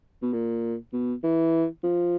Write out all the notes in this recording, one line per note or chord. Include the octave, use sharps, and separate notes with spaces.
B2
A#2
B2
E3
F3